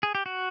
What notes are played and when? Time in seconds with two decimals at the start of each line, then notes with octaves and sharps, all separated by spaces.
0.03 G#4
0.15 G4
0.26 F#4